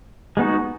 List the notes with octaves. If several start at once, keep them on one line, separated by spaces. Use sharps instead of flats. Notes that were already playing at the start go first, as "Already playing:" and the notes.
G#3 B3 D#4 F#4